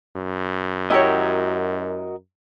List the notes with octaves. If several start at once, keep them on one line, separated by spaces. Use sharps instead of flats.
F#2
E4 F#4 G4 A#4 C#5 D#5